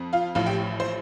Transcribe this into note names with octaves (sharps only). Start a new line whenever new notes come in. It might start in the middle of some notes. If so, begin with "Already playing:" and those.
Already playing: F2
F4 F5
A1 A2 F3 F4 F5
G4 G5
C5 C6